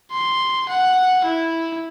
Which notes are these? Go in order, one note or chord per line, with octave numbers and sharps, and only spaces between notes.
C6
F#5
E4